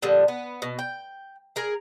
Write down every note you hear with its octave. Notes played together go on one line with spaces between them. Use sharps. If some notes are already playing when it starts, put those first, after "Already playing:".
A#2 D3 F3 G3
B3
B2
G5
G#4 A#4